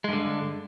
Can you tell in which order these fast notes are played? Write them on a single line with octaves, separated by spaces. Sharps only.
G#3 G2 D3